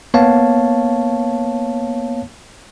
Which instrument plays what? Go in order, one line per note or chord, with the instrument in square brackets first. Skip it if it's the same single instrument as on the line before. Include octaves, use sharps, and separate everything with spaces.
[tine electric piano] A#3 B3 C#5 F5 A5